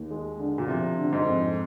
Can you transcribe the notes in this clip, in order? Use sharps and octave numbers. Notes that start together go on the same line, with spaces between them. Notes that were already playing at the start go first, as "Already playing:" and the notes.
Already playing: D#2
G#3
D3
A#2
C3 F3
D3
G#2
F2